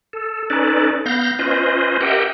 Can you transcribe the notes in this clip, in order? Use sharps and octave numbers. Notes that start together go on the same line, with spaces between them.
A4
C#4 D#4 A4 B4 D5
B3 F5 G6 A#6
C#4 F4 B4 C5 D#5
G4 A#4 D#5 E5 F#5 G5